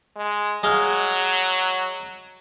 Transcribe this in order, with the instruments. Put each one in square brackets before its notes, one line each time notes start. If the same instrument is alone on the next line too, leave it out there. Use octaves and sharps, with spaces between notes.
[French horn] G#3
[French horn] F#3 [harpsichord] G#3 F5